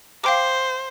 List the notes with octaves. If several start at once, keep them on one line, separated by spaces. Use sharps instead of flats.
C5 F5 G5 D6